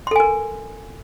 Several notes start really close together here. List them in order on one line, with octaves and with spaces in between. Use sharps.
C6 A4 G#5 A#4